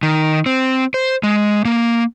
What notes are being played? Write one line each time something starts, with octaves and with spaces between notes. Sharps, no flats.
D#3
C4
C5
G#3
A#3